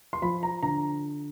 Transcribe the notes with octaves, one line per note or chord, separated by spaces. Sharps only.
C6
F3 B5
A#5
D3 A#5